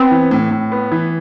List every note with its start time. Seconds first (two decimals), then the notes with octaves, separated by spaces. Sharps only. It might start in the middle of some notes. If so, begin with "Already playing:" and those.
Already playing: B3 C4
0.11 E3
0.31 A2
0.51 A2
0.72 B3
0.91 E3